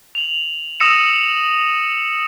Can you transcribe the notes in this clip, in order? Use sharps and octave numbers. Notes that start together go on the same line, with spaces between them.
F7 F#7
D#6 E6 A#6 C#7 D#7 E7